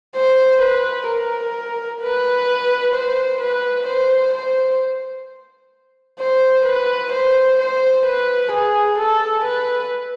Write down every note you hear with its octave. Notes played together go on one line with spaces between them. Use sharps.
C5
B4
A#4
B4
C5
B4
C5
C5
C5
B4
C5
C5
B4
G#4
A4
B4